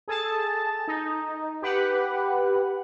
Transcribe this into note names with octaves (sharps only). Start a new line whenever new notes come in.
G#4 A4 A5
D#4
G4 B4 F#5